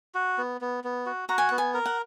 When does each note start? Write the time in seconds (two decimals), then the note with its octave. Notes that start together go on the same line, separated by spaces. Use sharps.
0.14 F#4
0.38 B3
0.61 B3
0.84 B3
1.06 F#4
1.29 F#4 A#5
1.38 G#5
1.49 B3 F#5
1.58 G#5
1.74 A#4
1.86 F#5